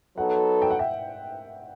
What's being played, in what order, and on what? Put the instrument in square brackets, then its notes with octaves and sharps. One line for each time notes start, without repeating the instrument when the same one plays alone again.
[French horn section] F#3 B3 D#4 A4 [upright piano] F#5
[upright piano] G5
F#5
E5 G5